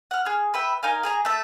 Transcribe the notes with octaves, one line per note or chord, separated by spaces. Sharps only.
F#5 F6
G#4 F6
B4 E5 G5
D#4 A#4 F5 G#5
G#4 G#5 A#5
A3 A4 E5